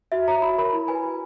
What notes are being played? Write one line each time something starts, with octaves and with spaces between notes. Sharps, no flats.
F#4 E5
C#5 A#5
F#4 B5
A#4 C#5 B5
E4
B4 G#5
F#4